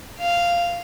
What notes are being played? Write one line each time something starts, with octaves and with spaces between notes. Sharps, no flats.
F5